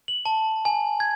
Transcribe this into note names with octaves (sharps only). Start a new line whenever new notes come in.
F#7
A5
G#5
G#6